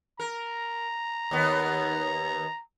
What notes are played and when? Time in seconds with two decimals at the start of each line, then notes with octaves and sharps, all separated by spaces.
0.20 A#4 A#5
1.31 D#2 B3